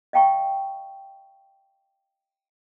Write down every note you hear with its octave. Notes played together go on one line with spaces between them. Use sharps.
D#5 F5 G5 A#5 C#6